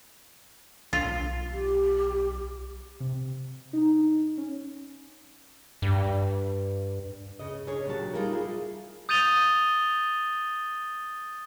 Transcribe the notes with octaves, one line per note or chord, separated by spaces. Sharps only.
B1 F4
G4
C3
D#4
C#4
G2
C#3 D#5
C#4 D4 G#4 C#5
A#2 F#3 G4 F#5 A5
G3 D#4 F4 G#4 A#4
E4 F4 G#4
D#6 G6 A6 D#7 F7 G7